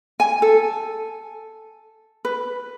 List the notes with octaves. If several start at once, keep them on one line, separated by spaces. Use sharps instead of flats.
G#5
A4
B4